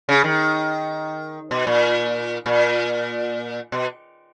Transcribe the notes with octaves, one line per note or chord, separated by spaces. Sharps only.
C#3
D#3
B2
A#2
A#2
B2